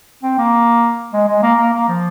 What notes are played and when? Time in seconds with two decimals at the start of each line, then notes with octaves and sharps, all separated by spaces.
0.23 C4
0.38 A#3
1.13 G#3
1.28 G#3
1.43 A#3
1.58 A#3
1.73 A#3
1.88 F3